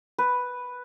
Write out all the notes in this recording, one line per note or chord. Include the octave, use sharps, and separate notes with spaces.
B4